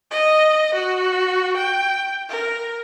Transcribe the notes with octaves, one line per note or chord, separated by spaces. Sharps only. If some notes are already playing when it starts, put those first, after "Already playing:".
D#5
F#4
G5
A#4